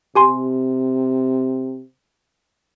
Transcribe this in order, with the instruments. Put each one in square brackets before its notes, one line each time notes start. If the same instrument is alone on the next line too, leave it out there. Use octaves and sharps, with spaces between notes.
[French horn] C3 [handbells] G4 G#5 C6